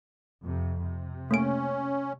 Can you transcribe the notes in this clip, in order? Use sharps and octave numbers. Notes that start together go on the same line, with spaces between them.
F2 C3
C3
A3 A#3 C#4 D7